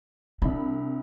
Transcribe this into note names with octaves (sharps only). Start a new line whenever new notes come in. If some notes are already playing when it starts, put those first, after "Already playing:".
C2 D4 B5